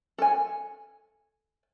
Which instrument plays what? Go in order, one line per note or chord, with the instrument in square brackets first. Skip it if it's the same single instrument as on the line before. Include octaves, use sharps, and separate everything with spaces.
[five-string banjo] A4 G#5